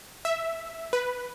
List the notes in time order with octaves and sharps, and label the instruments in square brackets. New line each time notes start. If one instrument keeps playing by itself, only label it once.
[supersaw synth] E5
B4